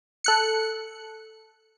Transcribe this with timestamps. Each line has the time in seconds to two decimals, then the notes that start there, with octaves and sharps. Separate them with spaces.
0.24 A4 F#6 C#7